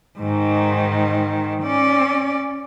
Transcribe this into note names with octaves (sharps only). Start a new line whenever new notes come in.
G#2 D#3
C#4 D5